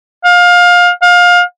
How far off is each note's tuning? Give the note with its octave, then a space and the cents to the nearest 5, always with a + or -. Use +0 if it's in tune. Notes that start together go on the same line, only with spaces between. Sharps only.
F5 +25
F5 +25